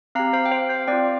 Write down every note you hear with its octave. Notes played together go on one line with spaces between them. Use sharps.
C4 G4 F5 A#5
C5 F5
G5
C5 F5
C5 F5
C4 F4 D5 G5